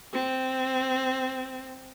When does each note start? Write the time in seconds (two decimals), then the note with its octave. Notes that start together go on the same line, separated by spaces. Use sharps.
0.13 C4